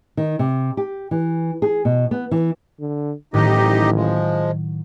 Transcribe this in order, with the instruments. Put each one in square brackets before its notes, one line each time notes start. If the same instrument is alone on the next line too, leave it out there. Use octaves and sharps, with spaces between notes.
[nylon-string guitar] D#3
C3
G4
E3
G#4
B2
B3
E3
[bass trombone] D3
[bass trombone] A1 [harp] A2 D#3 F#3 [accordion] D#4 G4 D#5
[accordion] F3 G#3